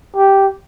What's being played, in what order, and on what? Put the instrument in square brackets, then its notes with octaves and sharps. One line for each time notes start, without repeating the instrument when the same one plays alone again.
[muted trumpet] G4